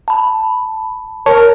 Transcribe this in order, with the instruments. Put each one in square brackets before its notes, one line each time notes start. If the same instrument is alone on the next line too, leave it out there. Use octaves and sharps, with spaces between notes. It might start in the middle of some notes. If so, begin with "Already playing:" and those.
[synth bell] A5 B5
[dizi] A#4 [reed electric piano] C#5 [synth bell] A5